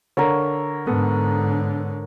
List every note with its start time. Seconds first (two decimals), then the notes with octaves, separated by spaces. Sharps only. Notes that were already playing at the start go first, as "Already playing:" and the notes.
0.17 D3 A#4 C#5
0.87 G#2 D3 B3 A4